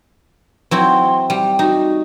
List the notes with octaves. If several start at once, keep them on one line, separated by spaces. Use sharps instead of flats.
F#3 C4 E4 C6
G3 G5
D#4 F#4